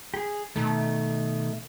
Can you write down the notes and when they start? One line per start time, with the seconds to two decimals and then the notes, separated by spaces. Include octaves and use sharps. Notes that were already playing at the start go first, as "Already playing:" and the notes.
0.14 G4 G#4
0.56 B2 D#3 A3